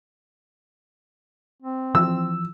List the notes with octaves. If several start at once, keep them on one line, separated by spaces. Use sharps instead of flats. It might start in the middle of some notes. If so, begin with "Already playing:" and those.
C4
E3 F3 E6